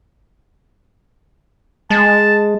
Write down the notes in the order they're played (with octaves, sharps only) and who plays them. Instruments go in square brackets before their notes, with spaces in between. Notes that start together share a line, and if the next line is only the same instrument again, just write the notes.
[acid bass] G#3 [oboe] A5